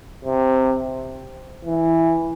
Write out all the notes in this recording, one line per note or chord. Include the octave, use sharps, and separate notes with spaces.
C3
E3